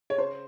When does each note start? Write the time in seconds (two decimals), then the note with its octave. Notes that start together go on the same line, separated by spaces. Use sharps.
0.10 C#5
0.18 C#3 C5